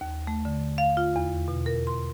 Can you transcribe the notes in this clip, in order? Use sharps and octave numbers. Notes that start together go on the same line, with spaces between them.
D#2
A3
D3
F5
F4
E2
B2
A#4
C6